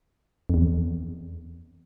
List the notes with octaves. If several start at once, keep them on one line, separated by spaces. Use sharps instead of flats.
F2
E2